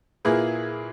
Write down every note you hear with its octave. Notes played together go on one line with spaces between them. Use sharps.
A#2 A#3 E4 G#4 B4